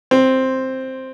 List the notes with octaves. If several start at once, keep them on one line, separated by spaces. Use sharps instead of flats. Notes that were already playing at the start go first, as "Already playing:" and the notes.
C4